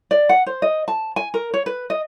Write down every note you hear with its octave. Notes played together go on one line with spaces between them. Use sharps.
D5
F#5
C5
D#5
A5
G#5
A#4
C#5
B4
D#5